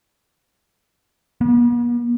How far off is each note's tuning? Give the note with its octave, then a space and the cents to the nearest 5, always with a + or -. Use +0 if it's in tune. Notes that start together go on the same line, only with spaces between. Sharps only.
B3 -45